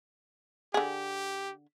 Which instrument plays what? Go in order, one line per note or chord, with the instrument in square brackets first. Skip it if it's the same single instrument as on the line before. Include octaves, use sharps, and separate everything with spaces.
[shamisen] D3 G#4 [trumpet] G4